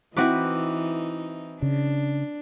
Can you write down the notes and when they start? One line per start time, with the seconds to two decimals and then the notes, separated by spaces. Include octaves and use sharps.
0.17 E3 C4 D#4 E4 F#4 B4 D6 F#6
1.62 C#3 D4